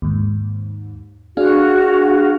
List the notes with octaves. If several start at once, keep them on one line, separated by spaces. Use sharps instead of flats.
D#2 G#2
D4 F#4 G#4 F5